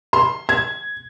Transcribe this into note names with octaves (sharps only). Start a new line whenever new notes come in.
C6
G#6